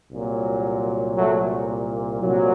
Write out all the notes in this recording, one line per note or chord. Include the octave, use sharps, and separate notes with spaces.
C2 A#2 F#3
F#3 A3
C2 A#2 F#3